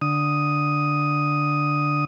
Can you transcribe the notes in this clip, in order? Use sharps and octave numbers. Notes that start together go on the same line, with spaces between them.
D3 D#6